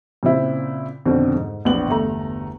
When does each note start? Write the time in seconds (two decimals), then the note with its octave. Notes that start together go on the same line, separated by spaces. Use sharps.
0.23 A#2 C#3 C4 E4
1.05 F2 B2 D3 D#3 C4 D4
1.35 G#2
1.65 A#1 E2 B3 D4 F#7
1.88 G1 E2 A3 A#5